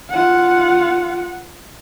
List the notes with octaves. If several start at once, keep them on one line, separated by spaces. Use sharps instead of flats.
F4 F#5